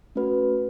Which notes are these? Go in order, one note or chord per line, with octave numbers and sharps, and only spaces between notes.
A3 C#4 F#4 B4